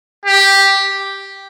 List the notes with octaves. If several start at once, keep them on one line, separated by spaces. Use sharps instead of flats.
G4